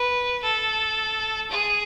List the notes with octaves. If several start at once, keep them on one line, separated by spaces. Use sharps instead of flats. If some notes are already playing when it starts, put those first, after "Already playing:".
Already playing: B4
A4
G#4